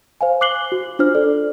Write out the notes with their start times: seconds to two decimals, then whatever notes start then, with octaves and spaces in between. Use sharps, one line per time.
0.21 C5 F5 G#5
0.41 D6 F#6 C7 F#7 G7
0.72 F#4
0.99 D4 F4 C5 F6
1.15 A4 D5